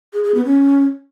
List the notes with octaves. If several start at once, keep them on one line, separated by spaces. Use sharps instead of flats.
G#4
G#4
B3
C#4